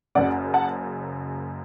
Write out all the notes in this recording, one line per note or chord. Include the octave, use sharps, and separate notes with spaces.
F#1 F#2 C#3 D5 F#5
F#5 A5